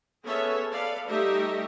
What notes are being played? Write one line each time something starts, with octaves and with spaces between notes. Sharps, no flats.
B3 C#4 G#4 A4 C#5 E5
A4 B4 D5 F5
G3 A3 D#4 G4 D#5 E5